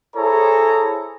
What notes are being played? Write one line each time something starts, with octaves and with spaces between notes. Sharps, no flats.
E4 G#4 A4 C5 C#5 A#5